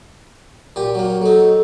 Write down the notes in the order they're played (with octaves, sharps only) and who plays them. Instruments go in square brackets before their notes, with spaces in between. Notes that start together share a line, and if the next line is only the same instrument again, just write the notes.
[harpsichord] A#2 G4
F#3 A#3
[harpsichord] F#3 D#4 [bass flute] A4